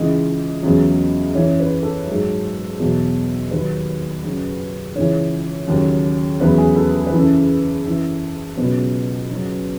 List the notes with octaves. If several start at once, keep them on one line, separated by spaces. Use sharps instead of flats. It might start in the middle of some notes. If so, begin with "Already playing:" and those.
Already playing: C#2 C#3 E3 D#5
E2 C#3 F#3
F#2 E3 C#5
B4
A4
G#2 F#3
E2 B2 F#3
D#2 D#3 F#3 B4
F#2 C#3 F#3
C#2 C#3 E3 C#5
D#2 C#3 F#3
E2 C#3 F#3 B4
G#4
A4
A4
B4
F#2 C#3 E3
A4
F#2 E3
C#2 B2 F#3 B4
F#2 C#3 F#3